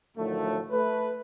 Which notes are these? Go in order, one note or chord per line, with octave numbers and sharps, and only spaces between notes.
A2 D3 D#3 F3 F#3 A3
A3 B4